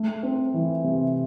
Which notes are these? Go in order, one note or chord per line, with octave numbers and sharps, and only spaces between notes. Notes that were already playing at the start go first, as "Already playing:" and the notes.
Already playing: A3
C4
E3
C3